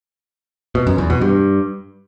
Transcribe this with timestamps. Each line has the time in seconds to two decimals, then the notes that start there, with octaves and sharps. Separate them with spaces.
0.75 B2
0.87 F#2
0.98 E2
1.10 B2
1.21 G2